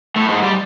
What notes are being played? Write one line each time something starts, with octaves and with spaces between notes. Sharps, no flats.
A2 A3
G#2 G#3
G3